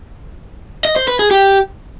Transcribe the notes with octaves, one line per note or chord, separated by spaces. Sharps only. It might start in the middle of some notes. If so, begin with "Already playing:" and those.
D#5
C5
B4
G#4
G4